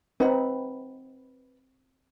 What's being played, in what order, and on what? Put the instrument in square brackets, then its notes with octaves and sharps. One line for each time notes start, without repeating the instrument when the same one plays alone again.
[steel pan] C4 D#4 [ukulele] B4 F#5 B5